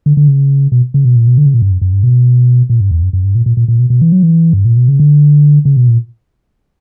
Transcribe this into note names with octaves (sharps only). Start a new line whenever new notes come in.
D3
D3
C#3
B2
C#3
B2
A#2
B2
D3
C#3
A#2
G2
F#2
F#2
G2
B2
A#2
G2
E2
F#2
F#2
G2
A#2
A#2
A#2
A#2
B2
B2
E3
F#3
E3
G2
A#2
B2
C#3
D3
C#3
B2
A#2